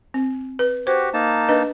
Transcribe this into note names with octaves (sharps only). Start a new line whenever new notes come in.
C4
B4
F#4 G4 C5
A#3 D#4 A5
D4 B4 D#5